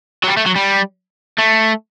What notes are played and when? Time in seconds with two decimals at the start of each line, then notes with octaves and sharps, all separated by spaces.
0.24 F#3
0.28 G3
0.37 A3
0.46 F#3
0.56 G3
1.38 A3